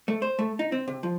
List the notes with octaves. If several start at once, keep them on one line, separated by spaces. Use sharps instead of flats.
A3
C5
A3
D#4
C4
C3
F3